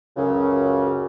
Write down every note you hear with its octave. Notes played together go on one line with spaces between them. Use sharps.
C#2 F#2 C#3